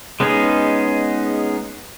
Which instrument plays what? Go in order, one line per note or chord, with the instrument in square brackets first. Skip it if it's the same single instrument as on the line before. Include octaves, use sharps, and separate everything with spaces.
[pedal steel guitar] G#3 B3 C#4 D#4 G#4